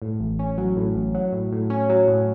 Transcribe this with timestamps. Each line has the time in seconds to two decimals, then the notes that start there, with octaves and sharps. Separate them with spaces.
0.02 A2
0.20 A1
0.39 C#4
0.58 F#3
0.77 A2
0.95 A1
1.14 F#3
1.33 A2
1.52 A2
1.70 C#4
1.90 F#3
2.08 A2